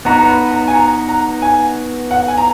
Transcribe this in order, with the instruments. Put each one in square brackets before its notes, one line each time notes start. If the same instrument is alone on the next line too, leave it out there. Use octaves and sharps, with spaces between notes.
[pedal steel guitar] B3 D#4 F#4 B4 [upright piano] A#5
[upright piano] A#5
B5
A#5
G#5
A#5
A#5
G#5
F#5
G#5
A#5